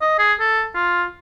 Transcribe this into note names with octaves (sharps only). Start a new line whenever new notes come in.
D#5
G#4
A4
F4